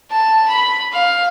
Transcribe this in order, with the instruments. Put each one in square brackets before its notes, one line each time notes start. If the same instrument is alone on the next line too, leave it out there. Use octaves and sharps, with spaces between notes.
[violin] A5
B5
F5